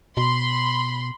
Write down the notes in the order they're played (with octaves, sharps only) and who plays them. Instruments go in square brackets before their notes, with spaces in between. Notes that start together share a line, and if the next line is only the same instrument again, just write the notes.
[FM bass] B2 [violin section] B5 C6